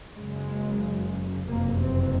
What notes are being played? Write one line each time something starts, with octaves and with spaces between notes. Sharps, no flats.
F#1 F#2 C#3 G#3
F#1 F2 C3 A#3
C4